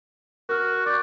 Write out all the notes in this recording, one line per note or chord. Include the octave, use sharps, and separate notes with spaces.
F#4 A#4 F6
D5 C#6 G6